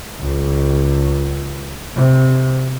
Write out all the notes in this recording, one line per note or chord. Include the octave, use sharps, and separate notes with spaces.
C#2
C3